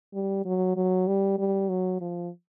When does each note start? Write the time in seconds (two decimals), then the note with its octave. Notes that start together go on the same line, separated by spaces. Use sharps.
0.13 G3
0.45 F#3
0.76 F#3
1.07 G3
1.38 G3
1.69 F#3
2.01 F3